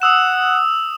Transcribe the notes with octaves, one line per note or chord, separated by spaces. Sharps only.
F#5 D#6 E6 E7